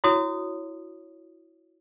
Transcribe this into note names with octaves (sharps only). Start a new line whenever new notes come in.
E4 F#4 C#5 D#6